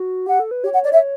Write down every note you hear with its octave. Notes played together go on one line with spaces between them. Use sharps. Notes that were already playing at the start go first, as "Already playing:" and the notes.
Already playing: F#4
G4 F#5
A4
B4
G4 C#5
F#5
D5
E5